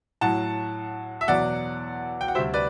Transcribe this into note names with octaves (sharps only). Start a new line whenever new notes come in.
A2 F#3 F#5 A5
E5
E2 B2 F#3 D5 F#5
G5
F#5
D2 C3 G3 C5 E5
B4 D5